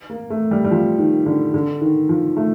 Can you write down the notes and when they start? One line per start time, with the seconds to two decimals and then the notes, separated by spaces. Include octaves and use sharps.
0.10 A#3
0.30 A3
0.51 G3
0.64 G3
0.71 F3
0.98 D#3
1.26 D3
1.54 D3
1.81 D#3
2.09 F3
2.36 A3